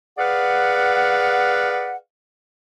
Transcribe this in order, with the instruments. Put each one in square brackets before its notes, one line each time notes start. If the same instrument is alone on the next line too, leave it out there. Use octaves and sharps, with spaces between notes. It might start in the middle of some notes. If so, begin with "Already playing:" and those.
[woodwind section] G#4 B4 D5 F5 F#5